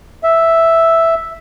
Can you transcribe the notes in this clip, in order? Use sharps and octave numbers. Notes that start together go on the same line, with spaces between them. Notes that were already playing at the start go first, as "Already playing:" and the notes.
E5